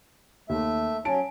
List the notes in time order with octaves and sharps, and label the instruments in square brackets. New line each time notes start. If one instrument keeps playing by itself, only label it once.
[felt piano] D#2 [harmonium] A3 E5
[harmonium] F#3 C#4 [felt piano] G#5 A5 D7